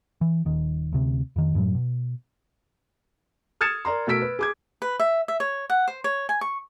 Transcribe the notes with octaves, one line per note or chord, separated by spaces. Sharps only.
E3
D#1 D#3
D2 C3
F2 D#3
F#2 A2 C#3 F#3
B2
D#6 F6 G#6 A6 C#7 E7
A#4 D5 A#5 C6
B2 A3 A#4 E6 B6 D7
B4
G#4 D6 G#6
B4
E5
E5
C#5
F#5
C5
C#5
G#5
C#6